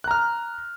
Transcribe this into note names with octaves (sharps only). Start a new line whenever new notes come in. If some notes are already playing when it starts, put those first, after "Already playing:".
A#5 F6 F#6